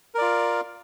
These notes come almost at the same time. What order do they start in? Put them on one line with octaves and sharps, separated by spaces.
A#4 D5 F4